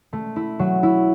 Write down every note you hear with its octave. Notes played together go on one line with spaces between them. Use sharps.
A3
E4
F#3
E4